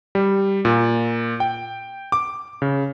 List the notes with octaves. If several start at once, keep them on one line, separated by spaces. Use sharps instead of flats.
G3
A#2
G5
D6
C#3